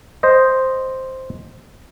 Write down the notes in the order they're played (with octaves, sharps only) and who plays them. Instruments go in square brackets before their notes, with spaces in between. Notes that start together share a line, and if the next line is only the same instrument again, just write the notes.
[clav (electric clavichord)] C5 D#5